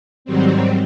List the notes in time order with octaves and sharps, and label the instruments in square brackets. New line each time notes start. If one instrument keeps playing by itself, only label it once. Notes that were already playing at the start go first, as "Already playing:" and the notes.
[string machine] G#2 D#3 F#3 G3 C4